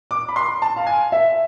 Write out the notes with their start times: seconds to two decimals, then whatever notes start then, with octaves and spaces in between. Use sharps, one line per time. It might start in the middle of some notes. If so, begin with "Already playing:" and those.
0.11 D6
0.29 B5
0.36 C6
0.62 A5
0.76 F5
0.87 G#5
1.12 E5